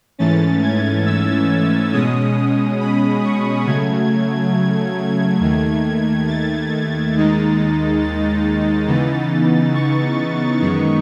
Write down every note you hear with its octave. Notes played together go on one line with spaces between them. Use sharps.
G#2 E3 A3 C#4 A6
G#6
E6
B2 G#3 C#4 D#6
D#6
B5
C#6
C#3 F#3 A3 G#6
D#2 D#3 A3
A6
D#2 D#3 G#3 D#4
A6
C#3 E3 B3 D#4
C#6
F#2 D#3 G#3 B3 D#4